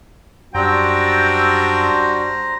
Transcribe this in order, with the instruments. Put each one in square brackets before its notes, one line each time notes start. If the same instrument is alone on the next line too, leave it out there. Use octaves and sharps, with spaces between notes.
[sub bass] F#2 [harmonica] G3 D4 F#4 [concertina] C5 A#5 [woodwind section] G5 E6